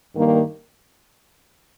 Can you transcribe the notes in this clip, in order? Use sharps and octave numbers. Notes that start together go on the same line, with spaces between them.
G2 D#3 G3 A#3